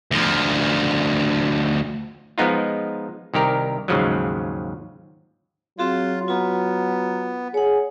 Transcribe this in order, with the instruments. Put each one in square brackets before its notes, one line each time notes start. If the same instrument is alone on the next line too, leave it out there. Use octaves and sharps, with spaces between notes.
[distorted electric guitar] D2 F3
[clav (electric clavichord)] F3 G#3 B3 D#4 F4
C2 D#3 G4 A#4
D#2 G#2 C#3 F3 F#3
[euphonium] F#3 [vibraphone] C4 F#4 G#4 [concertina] F4
[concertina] B3 [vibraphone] F4 A#5
[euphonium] G#4 [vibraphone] C#5 F#5